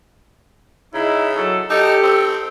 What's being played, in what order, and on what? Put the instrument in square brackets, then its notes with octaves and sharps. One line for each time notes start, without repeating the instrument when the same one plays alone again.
[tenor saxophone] C#3 [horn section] D#4 E4
[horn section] F#3 A4
[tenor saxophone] D#4 [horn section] G4 A4
[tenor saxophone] C4